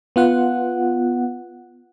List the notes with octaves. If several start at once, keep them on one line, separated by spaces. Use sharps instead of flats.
B3 F4 F#5